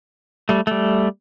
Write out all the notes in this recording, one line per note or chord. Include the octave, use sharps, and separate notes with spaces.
G3 A3
G3 A3